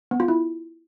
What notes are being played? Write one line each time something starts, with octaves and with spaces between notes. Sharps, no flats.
B3
F4
E4